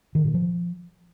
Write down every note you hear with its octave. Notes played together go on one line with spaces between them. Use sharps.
D#3
A#2
F3